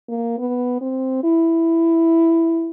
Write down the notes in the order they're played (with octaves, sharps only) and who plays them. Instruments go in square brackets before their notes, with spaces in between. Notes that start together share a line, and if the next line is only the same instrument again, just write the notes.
[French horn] A#3
B3
C4
E4